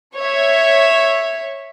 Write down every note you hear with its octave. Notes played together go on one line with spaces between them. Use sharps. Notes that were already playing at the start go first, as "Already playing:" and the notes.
C#5 E5